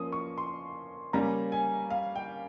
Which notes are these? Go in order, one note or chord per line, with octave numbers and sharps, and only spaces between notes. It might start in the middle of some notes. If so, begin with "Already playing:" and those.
Already playing: F3 A#3 C#4 D#6
C#6
C6
C#3 G3 A#3 C#4 A#5
G#5
F5
G5